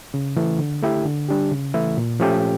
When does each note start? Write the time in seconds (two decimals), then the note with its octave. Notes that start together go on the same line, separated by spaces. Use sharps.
0.14 C#3
0.36 E3 A3
0.59 D3
0.83 A3 E4 G4
1.05 D3
1.29 G3 D4 G4
1.51 C#3
1.74 E3 A3 E4
1.98 A#2
2.20 F3 A3 C#4 G4